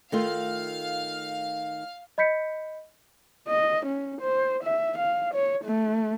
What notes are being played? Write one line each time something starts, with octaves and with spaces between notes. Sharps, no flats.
D#3 A3 F4 F5
D#5 B5 G6 B6 C#7
D#5
C#4
C5
E5
F5
C#5
A3